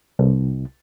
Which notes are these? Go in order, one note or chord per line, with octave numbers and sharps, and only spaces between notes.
C2